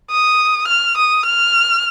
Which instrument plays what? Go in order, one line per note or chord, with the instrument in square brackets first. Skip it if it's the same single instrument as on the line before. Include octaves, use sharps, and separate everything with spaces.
[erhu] D#6
F6
D#6
F6